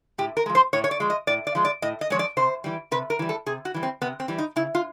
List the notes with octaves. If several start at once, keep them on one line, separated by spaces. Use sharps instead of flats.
A2 G4
A#4
F3 G#3
C5
A2 C#5
C#5
D5
F3 G#3
D#5
A2 D5
D5
F3 G#3
D5
A2 D#5
D#5
F3 G#3 C#5
D5
C3 C5
E3 G3
C3 B4
A#4
E3 G3
A4
C3 G#4
F#4
E3 G3
C4
C3 B3
C4
E3 G3
D#4
C#3 E4
F4